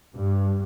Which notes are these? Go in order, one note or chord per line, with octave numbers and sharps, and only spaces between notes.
G2